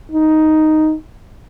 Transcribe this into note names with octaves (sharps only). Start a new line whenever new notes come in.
D#4